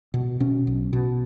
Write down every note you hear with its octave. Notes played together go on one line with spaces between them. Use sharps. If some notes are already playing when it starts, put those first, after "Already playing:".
B2
B2 C#4
B1
B2